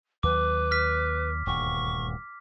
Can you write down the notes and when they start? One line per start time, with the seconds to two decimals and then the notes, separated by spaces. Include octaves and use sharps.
0.23 D#2 F#3 B4 D6
0.71 F6 B6
1.47 D#1 D2 G2 C#6